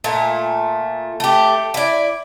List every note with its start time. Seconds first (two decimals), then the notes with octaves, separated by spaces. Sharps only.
0.04 A#2 A3
1.20 A3 G4
1.74 E4 D5